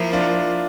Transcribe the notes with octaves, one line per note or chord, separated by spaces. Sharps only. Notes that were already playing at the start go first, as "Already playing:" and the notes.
Already playing: F3 A#3 E4
D4 F4